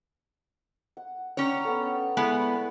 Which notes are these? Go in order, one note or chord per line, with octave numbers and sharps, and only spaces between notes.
F#5
C#4 D4 C#5 G5 A#5
B3 A4
G#3 A3 B3 E4 D5